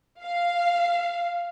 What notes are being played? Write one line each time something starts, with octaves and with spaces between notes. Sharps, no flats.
F5